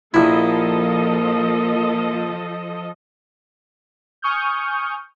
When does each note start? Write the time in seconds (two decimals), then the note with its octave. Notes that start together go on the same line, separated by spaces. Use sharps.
0.14 A#1 F3 A#3 E4 A4 D#5
4.22 G#5 C#6 D#6 F6 G6